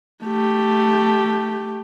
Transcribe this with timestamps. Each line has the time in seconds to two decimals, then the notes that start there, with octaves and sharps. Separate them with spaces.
0.23 A3 G4